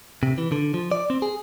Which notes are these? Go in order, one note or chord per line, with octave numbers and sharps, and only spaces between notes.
C3
E3
D3
F3
D5
C4
G#4